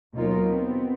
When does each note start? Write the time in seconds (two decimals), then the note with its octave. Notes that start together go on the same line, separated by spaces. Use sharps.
0.13 D#2 B2 F#3 D#4 F4 A#4
0.46 B3 C4